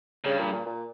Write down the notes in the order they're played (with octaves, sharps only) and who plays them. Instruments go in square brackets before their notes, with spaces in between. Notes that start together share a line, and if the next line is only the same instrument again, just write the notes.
[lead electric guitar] G2 [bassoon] C#3
[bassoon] A#2
A#2
A#2